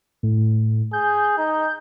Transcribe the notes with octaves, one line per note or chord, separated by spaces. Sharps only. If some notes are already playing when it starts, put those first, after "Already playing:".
A2
G#4 G6
D#4